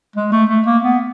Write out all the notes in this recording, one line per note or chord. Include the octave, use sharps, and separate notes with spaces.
G#3
A3
A3
A#3
B3